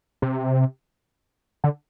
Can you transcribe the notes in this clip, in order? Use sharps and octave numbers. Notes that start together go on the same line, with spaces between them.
C3
D3